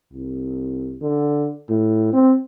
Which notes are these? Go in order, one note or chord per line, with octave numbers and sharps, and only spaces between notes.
C2
D3
A2
C4